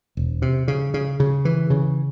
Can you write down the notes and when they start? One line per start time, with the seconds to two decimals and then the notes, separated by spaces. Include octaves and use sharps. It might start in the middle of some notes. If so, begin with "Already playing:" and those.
0.17 E1
0.42 C3
0.68 C#3
0.94 C#3
1.20 C#3
1.45 E3
1.70 C#3